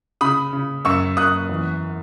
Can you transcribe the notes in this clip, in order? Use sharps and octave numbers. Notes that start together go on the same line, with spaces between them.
C#3 B5 D#6
C#3
F#2 C#6 E6
F#2 D#6 F#6
E2